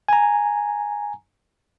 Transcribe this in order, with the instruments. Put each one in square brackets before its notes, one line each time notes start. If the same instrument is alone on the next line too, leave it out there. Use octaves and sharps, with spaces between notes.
[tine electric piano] G#5 A#5